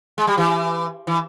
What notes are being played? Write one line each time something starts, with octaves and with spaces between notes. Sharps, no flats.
G#3
G3
E3
E3